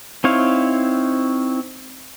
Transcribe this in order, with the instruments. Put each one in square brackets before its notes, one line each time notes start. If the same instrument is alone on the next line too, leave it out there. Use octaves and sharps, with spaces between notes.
[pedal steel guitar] C4 D#4 E4 C#5 F5